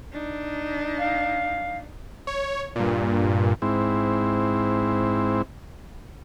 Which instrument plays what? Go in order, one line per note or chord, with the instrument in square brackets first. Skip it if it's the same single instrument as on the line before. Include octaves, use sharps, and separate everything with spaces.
[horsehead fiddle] D4 D#4
[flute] F5
[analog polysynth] C#5
G2 A#2
[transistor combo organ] G#2 C4 E4